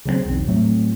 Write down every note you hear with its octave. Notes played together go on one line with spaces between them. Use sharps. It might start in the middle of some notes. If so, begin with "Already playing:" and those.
C#3 F#3 A3 C4
B1 E2
A2 F#3 A3 C4